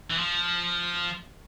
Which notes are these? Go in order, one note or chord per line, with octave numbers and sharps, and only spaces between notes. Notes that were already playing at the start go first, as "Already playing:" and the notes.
E3
F3